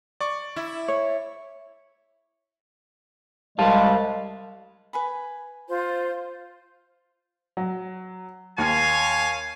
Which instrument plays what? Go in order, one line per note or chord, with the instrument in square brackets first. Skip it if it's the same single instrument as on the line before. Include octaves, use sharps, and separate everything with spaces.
[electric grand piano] D5 C#6
[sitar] E4
[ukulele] C#5
[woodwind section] C2 G3 G#3 [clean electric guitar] F5 A5
[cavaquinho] B4 G#5 B5
[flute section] F4 C5
[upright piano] F#3
[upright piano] D#2 [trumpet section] C#5 F5 G#5